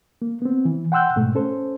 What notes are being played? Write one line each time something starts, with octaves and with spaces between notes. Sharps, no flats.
A#3
B3 C4
E3
F#5 G5 C6 E6 F#6 G6
G#2 B2 A3
C#4 A4 C5